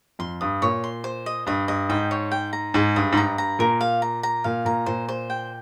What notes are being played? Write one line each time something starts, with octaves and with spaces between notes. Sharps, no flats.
F2 C6
G2 D#6
A#2 C#5
C6
C5
D#5
G2 D#5
G2 D#5
G#2 G5
C#5
G5
A#5
G#2 G#4
G2 D#5
G#2
G2 A#5
A#5
A#2 A#4
F5
A#5
A#5
A#2 F5
A#2 A#5
A#2 C5
C5
G5